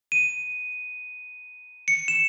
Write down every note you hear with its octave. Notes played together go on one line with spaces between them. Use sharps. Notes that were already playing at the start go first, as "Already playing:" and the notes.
D#7
C#7
E7